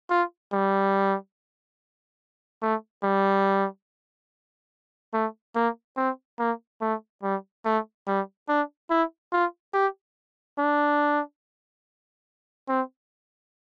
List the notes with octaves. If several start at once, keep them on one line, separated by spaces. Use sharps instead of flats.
F4
G3
A3
G3
A3
A#3
C4
A#3
A3
G3
A3
G3
D4
E4
F4
G4
D4
C4